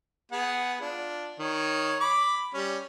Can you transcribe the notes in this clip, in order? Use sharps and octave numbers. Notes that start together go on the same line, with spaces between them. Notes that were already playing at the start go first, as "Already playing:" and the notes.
B3 G#4 F#5
D4 F4
D#3 C#5
B5 D6
G3 C#4